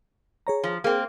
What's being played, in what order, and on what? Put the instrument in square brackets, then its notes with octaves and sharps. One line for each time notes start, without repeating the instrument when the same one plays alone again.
[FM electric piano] G#4 C#5 A#5
[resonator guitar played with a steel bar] F3
[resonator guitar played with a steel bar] A#3 C4 [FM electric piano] G#4